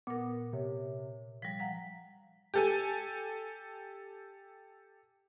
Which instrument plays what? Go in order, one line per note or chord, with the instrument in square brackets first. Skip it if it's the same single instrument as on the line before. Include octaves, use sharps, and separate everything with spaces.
[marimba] A#2 A#4 [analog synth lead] B3
[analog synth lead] C3 [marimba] C#5
[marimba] F3 G3 [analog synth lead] B6
[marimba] F5 F#5 A#5
[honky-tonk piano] G4 A4 G#5